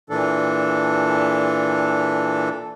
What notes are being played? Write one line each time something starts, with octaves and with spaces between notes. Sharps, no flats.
A#2 E3 D4 A4